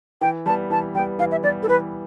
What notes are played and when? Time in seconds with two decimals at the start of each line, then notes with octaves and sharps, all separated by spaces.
0.21 E3 G5
0.46 G3 A5
0.50 B3
0.70 E3 A5
0.95 G3 G5
0.99 B3
1.19 E3 F5
1.31 E5
1.43 G3 B3 D5
1.63 A4
1.67 E3 B4